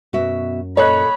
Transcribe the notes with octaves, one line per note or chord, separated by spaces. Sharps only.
F#2 B2 F#4 E5
A#2 A4 C#5 D#5 B5 F#6